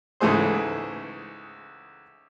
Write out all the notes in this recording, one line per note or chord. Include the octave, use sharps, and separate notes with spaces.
C#2 G#2 E3 A3 G#4 C5